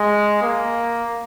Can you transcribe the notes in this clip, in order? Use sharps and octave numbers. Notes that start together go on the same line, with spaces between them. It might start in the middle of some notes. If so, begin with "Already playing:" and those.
Already playing: G#3
A#3